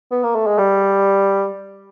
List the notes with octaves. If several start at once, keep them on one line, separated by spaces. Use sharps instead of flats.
B3
A#3
A3
G#3
G3